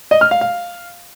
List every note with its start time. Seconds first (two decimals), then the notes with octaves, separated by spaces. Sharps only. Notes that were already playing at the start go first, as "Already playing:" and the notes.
0.11 D#5
0.21 F6
0.31 F5
0.41 F5